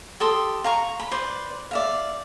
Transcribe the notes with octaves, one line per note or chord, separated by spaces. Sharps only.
G4 A4 C6 D#6
F5 A#5 C#6
B5
B4 C5 D5
D5 E5 F5